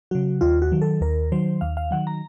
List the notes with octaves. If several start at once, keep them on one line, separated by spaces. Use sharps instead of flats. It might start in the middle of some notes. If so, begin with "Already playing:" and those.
C#3 F#3 F#4
D#2 F4
F#4
D#3 F#3
A4
D#2 A#4
D#3 F#3 C5
D#2 F5
F5
D#3 F#3 F#5
A#5